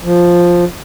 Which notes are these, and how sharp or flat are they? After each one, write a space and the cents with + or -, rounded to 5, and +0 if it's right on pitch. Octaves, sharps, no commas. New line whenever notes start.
F3 +5